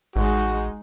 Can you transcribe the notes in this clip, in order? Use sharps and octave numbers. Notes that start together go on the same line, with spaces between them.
A1 G#3 D#4 F#4